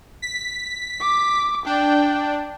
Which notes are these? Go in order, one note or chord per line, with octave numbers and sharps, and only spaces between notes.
B6
D6
D4 G5